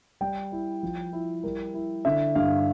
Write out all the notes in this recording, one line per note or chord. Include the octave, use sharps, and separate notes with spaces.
G3 G5
E4
F3
E4
G3 A#4
E4
D3 E5
G2 F5